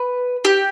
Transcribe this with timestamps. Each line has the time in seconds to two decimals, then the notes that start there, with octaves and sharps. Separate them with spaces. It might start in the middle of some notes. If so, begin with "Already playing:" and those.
Already playing: B4
0.45 G4